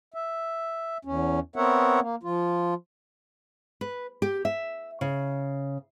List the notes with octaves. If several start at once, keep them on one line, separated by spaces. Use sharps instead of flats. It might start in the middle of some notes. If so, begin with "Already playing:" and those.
E5
E2 C#4
B3 C4 A#4 C#5 E5 F#5
A#3
F3 F4
B4
G4
E5
C#3